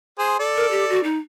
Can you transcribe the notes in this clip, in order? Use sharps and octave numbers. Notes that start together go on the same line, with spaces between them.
G#4 C5
A4 D5
A#4
G4
F#4
D#4